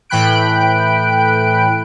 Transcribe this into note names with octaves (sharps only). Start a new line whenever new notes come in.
A2 E3 G5 B5 F#6 D7